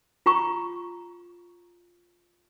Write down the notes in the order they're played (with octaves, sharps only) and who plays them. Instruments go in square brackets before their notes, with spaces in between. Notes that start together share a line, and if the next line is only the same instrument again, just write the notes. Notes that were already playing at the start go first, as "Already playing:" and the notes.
[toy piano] F4 A#5 C#6